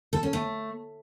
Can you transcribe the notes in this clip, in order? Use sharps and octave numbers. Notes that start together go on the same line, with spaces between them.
A4
C#4
A3